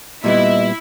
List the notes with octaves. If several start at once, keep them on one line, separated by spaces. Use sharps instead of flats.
A#2 G3 B3 E4 D#5 E5